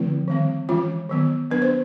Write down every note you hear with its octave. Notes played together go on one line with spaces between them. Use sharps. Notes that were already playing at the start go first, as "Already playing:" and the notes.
Already playing: D3 F3 A3 C4 E4
D#3 G3 C4
E3 G#3 C#4 F4
D#3 F#3 B3
F#3 B3 D4 B4
C5